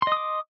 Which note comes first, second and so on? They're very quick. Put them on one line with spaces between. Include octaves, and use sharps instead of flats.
C6 D#5 D#6 D6